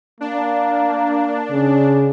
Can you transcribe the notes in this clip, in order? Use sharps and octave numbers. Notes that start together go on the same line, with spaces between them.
A#3 D4
C#3